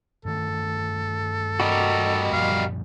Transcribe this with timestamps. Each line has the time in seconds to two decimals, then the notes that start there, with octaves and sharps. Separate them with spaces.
0.25 G2 D#3 A3 A4
1.60 G3 F#4 G4 A#4 D#5
2.33 F#2 A#2 F3 F5